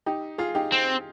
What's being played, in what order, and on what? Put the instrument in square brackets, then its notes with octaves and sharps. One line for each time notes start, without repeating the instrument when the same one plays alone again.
[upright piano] D#4 G4
F4 G#4
D#4 G4
[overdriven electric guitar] C4